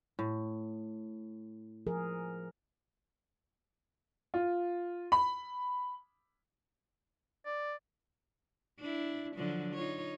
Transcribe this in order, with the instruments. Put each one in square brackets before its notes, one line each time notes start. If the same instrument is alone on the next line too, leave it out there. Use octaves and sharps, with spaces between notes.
[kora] A2
[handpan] F3 G#4 A#4
[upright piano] F4
B5
[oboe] D5
[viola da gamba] D4 E4
D3 F3 F#3
D#4 F4 C#5